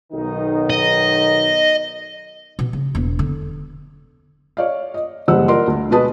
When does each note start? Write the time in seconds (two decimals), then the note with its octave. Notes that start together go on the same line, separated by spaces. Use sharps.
0.12 B1 D#3 D#4
0.70 D#5
2.59 B2
2.73 C#3
2.95 E1 B3
3.19 D3
4.57 C#5 D5 F5
4.94 D#5
5.28 F#1 E3 G3 C5 F#5 E6
5.48 F4 A#4 D5 F#5 C6
5.67 D2
5.90 B2 G#3 F#4 B4 A5 D#6